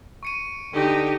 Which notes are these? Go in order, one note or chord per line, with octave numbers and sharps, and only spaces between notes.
C#6 C#7 D#7
D3 D#4 G4